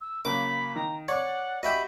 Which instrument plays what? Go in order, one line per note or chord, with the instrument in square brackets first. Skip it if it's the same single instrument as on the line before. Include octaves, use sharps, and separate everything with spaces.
[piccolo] E6
[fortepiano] C#3 F#3 A#3 [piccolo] B5 [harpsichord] D6
[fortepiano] D#3 [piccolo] A#5
[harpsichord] C#5 [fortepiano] D5 D6 [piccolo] F#5
[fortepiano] F#4 G4 [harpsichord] D#5 E5 G5 [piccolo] B5